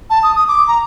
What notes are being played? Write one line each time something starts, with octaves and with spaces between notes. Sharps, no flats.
A5
D#6
D#6
D6
A#5